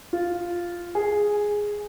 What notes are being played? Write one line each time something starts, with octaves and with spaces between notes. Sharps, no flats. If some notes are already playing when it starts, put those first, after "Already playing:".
F4
G#4